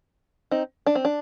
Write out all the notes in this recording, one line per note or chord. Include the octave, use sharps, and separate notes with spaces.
C4 D#4
D4
C4
D4